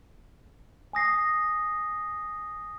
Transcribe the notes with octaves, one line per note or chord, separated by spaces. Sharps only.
G#5 D#6 A#6 C7